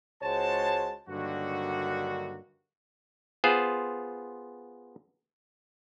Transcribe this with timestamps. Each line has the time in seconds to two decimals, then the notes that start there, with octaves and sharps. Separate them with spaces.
0.22 C#2 G#3 F#4 C5 C#5 A5
1.08 G2 D3 D#3 F#3 A#3 F#4
3.44 B3 F4 G#4 C5